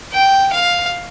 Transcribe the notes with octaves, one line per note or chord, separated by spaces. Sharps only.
G5
F5